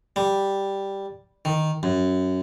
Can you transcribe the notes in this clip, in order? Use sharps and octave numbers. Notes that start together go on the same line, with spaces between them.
G3
D#3
F#2